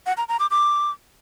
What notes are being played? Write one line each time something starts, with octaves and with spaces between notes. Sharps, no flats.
F#5
A#5
A#5
D6
D6